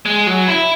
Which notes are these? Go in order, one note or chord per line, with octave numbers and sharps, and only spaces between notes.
G#3
F#3
E4